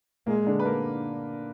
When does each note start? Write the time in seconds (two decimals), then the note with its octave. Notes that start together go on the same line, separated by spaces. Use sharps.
0.27 A#2 G#3 A#3
0.47 D3 D4
0.60 B4
0.65 A#3 A#4